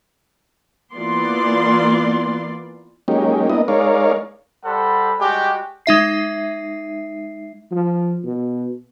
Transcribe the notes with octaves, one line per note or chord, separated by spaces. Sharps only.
E3 A#3 B3 F4 D5 C6
F#3 G#3 A#3 C#4 D#4 G4
A#3 B3 D4 E4 D#5
G#3 D#4 A#4 C#5 D5 F5
G3 A4 C5 F#5 B5
G3 G#3 F#4 G4
G#3 D#4 E5 C7
F3
B2